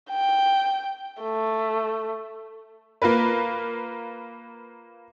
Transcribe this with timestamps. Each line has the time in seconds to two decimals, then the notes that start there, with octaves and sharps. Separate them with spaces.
0.11 G5
1.22 A3
3.02 A#3 F4 A#4 B4